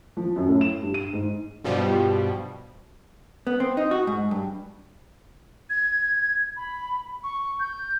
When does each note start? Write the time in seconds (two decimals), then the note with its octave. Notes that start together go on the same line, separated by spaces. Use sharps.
0.17 F3
0.36 F#2
0.48 A2
0.61 E7
0.83 G2
0.94 D#7
1.13 G#2
1.64 G2 B2 F3 G3
3.47 B3
3.60 C4
3.77 D#4
3.91 F#4
4.07 G#2
4.31 G2
5.70 G#6
6.57 B5
7.24 C#6
7.60 G6